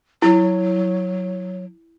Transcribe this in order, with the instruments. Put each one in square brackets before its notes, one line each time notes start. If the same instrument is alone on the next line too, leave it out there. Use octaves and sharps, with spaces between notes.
[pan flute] F#3 [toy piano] E4